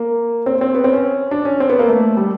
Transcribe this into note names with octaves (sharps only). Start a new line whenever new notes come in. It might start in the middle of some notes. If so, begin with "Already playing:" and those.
Already playing: A#3
C4
C4
B3
C4
C#4
D4
C#4
C4
B3
A#3
A3
G3